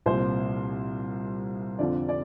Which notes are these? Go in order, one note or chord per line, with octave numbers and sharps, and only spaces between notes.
C2 A#2 F3 C5
F2 D3 F3 D5
D5